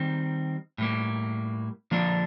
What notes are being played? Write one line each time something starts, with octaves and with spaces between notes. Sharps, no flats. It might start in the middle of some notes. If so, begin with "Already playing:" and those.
Already playing: D#3 G3 C4
A2 G3 A#3
D3 F3 A#3 D4